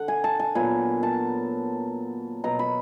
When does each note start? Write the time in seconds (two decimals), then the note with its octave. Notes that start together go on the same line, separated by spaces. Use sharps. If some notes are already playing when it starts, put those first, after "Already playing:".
Already playing: D3 F#5
0.08 G#5
0.24 A5
0.39 G#5
0.55 A#2 F#3 B3 G#5
1.03 A5
2.44 B2 F#3 B3 A#5
2.59 B5